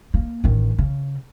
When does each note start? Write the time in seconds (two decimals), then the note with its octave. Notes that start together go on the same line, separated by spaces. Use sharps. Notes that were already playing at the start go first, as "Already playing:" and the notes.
0.14 A#3
0.44 A1 D#3
0.78 C#3